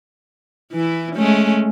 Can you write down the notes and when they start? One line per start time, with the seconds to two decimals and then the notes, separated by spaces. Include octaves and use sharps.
0.72 E3 E4
1.15 G#3 A3 C#4